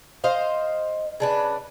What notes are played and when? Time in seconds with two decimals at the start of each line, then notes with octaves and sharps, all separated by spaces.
0.24 C5 D#5 F5
1.20 C#3 D4 B4